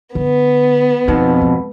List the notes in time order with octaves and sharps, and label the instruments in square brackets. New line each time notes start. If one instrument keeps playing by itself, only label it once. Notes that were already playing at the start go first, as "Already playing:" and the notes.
[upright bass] D3 [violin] B3
[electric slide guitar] F2 B2 [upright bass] D#4
[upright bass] G#3